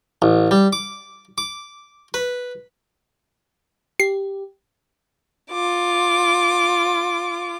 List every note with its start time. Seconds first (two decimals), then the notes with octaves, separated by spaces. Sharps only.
0.22 A1
0.51 G3
0.73 D6
1.38 D6
2.14 B4
4.00 G4 C7
5.52 F4 D6